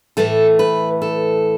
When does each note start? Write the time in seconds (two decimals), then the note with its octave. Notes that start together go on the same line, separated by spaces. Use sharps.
0.17 A2 E3 A3 A4
0.59 B4
1.02 A4